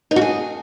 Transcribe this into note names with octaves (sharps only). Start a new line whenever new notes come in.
D#4
F#4
G#4